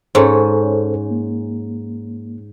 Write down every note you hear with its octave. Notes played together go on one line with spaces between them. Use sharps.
G#2 C#4 A4 C5
A#3